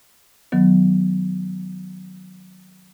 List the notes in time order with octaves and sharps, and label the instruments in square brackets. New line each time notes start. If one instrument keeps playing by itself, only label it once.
[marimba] D#3 F#3 B3